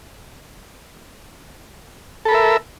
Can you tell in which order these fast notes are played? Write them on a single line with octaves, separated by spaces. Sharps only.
A4 B5 A#4 E5